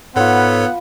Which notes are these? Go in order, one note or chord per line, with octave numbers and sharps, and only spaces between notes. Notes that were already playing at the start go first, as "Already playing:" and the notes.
G#2 B3 F4 A4 B4 C#5 F#5